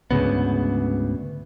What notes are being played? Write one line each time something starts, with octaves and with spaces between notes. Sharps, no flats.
D2 G#2 C#3 B3